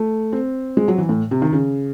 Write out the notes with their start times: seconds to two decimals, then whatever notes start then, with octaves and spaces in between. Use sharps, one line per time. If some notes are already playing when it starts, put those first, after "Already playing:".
Already playing: A3
0.33 C4
0.77 G#3
0.88 F#3
0.98 E3
1.09 A2
1.31 C3
1.42 D#3
1.52 C#3